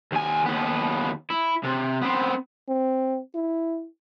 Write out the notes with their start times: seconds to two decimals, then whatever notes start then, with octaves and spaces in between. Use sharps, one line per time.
0.12 D#2 G#5
0.46 D#2 B3
1.30 E4
1.64 C3
2.02 B3 C4
2.69 C4
3.35 E4